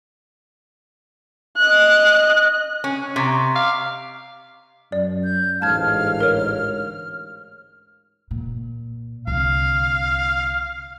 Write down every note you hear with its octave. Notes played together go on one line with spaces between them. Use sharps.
D#5 F#6
C#4
C3 A#5 C#6 B6
F5 D6
F#2 D5
G6
A1 D2 G#2 F5 A5 F6 G#6
A#4 C#5
A#2
C2 D3 F5